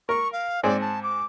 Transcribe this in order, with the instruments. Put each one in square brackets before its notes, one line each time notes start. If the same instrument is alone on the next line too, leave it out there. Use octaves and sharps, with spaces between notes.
[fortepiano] A#4 [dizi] C#6
[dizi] F5
[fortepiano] G#2 C4 G#4 [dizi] D5
[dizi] A5
D6